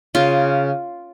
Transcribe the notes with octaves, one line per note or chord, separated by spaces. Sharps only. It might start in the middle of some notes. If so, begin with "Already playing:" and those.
C#3 F4